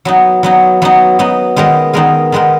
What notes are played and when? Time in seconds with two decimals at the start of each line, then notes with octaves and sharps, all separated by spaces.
0.05 F#3 B3 D#4
0.43 F#3 B3 D#4
0.82 F#3 B3 D#4
1.19 F#3 B3 D#4
1.56 D#3 G#3 B3 D#4 A#4
1.93 D#3 G#3 B3 D#4 A#4
2.32 D#3 G#3 B3 D#4 A#4